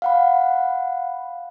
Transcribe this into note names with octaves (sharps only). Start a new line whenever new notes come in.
F5 F#5 B5